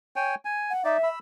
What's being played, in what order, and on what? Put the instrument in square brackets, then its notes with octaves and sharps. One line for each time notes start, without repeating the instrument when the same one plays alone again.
[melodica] C#5 G5 G#5
G#5
[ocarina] F#5
[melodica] D#4 D5 [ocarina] E5
[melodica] B5 E6